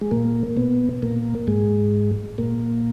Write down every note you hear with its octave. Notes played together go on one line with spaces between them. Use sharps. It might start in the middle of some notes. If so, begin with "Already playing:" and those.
G#3
A#2 A#3
B2 B3
A#2 A#3
G#2 G#3
A#2 A#3